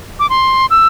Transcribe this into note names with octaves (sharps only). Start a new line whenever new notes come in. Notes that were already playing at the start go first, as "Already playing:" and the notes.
D6
C6
E6